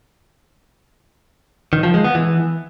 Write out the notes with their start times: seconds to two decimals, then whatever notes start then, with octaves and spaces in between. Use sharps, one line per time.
1.73 D#3
1.83 F3
1.94 G#3
2.04 B3
2.15 E3